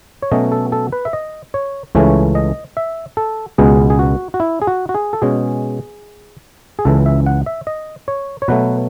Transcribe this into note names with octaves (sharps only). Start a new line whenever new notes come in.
C#5
B2 F#3 A3 C#4 D#5
A4
A4
B4
E5
D#5
C#5
C#2 C#3 E3 A3 C#4 C#5
D#5
E5
A4
C#2 B2 G#3 B3 G#4
G#4
F#4
F#4
E4
G#4
F#4
F#4
G#4
A4
B2 G#3 C#4 G#4
G#4
C#2 C#3 E3 A4
E5
F#5
E5
D#5
C#5
C#5
B2 F#3 A3 B4